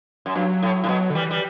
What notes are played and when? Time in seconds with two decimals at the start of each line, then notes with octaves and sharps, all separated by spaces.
0.26 F#2
0.35 G2 F#3
0.62 A2
0.84 A2
0.89 B2 F#3
1.10 D3
1.15 E3 G3
1.31 G3